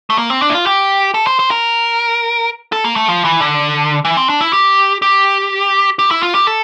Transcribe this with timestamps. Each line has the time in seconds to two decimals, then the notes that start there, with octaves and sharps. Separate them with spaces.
0.10 A3
0.18 A#3
0.30 C4
0.42 D4
0.50 E4
0.55 F4
0.66 G4
1.14 A4
1.27 C5
1.39 C5
1.51 A#4
2.72 A4
2.84 A#3
2.96 A3
3.09 F3
3.25 E3
3.41 D3
4.05 E3
4.17 C4
4.29 D4
4.41 E4
4.53 G4
5.02 G4
5.99 G4
6.11 E4
6.23 F4
6.35 G4
6.47 A4